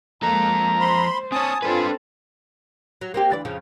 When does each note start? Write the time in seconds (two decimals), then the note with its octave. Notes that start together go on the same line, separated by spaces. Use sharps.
0.23 F3 G#3 A#3 A4 A#5
0.80 C5 B5 C6
1.32 C4 C#5 G#5 A5 D#6
1.62 C4 D4 F4 A4 B4
3.01 F#3
3.14 A#3 C4 G4
3.30 D2 E3 D5
3.45 F2 C#3 F3